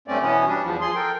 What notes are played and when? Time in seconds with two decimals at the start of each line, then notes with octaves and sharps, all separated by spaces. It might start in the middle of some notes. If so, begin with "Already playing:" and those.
0.08 G2 A3 C4 C#4 D5
0.21 B2 E3 B3 C#4
0.48 G3 D4
0.62 E2 F3
0.81 F3 G#4 C6
0.95 A4 A#4 G5